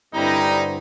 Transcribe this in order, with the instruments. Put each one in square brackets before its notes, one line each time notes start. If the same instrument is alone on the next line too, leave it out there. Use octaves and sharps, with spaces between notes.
[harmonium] G2 D3 C4 [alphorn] G3 [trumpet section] D#4 A#5 [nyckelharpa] E4